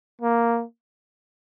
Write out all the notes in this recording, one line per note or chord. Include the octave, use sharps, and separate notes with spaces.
A#3